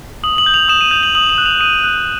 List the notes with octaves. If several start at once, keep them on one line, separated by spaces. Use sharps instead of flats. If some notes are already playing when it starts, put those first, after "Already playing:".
D#6 F#7
F#7
G6
F7
D#6 E7
D#7
G6 F7
F#7
D#6 F#7
F#7
F#6
F7
D#6 D#7
F#6